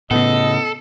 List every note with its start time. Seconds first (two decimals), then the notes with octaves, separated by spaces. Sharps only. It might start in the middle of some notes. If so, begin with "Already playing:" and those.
0.11 A2 C#3 B3 A4 D#5